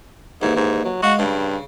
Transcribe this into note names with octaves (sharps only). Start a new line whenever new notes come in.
D#2 G#2 E3
G#2
F#3
G#3 F#4 F5
G2 C#3